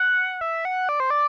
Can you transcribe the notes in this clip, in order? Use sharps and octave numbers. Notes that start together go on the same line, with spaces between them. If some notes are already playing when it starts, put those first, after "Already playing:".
Already playing: F#5
E5
F#5
D5
C5
D5